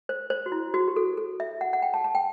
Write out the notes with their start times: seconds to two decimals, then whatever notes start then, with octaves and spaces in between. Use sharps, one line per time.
0.09 C5
0.30 C5
0.46 F#4
0.52 E4
0.74 F#4
0.88 G4
0.96 A4
1.17 A4
1.40 E5
1.61 F#5
1.73 F#5
1.82 G5
1.94 A5
2.04 A5
2.15 G5